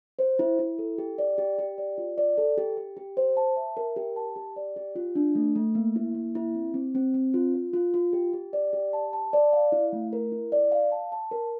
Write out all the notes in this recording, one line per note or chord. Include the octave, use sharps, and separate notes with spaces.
C5
E4
E4
A4
G4
D5
G4
G4
D5
F4
D5
A4
G4
G4
G4
C5
A5
E5
A#4
G4
A5
G4
D5
G4
F4
D4
A3
A3
A#3
E4
A#3
E4
C4
C4
C4
C4
F4
F4
F4
F4
G4
G4
D5
G4
A5
A5
D5
F5
E4
A3
A#4
E4
D5
F5
A5
A5
A#4